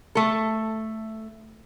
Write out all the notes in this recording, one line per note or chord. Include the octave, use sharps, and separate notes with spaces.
A3 A4